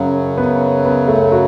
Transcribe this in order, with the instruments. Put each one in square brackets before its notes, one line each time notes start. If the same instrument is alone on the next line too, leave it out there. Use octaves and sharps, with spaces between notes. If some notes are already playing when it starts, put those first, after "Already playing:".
Already playing: [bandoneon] F#2 C#3 F#3 [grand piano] C#4
[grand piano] B3
B3
A3
F#4